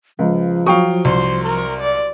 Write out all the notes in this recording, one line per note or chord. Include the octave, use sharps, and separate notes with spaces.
C#2 F3
F#3 F5 G5 C#6 D#6
C2 C5
A#4
D5